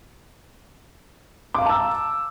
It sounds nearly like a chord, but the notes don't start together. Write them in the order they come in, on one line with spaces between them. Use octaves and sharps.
D6 F5 A#5 A5 E6